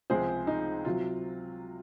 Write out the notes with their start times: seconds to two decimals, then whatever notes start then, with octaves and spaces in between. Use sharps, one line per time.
0.10 C#2 C3 F3 G#3 G#4 C5
0.47 D#4
0.85 C3 F#3 F4